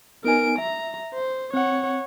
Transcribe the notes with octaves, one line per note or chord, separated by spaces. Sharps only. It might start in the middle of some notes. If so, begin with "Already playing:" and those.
B3 D#4 A#4 G#5 D7
E5 A#5
C5
C4 C#5 F#5